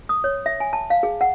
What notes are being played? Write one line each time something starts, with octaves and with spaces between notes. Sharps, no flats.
D#6
C#5
E5
G#5
A5
F5
G#4
F#5